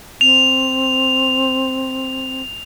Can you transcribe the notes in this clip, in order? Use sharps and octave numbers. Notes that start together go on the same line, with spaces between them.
C4 F7